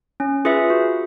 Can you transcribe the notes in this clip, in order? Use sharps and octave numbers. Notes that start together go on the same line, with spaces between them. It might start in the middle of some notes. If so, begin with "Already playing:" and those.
C#4
F4 G#4 B4 E5
F#4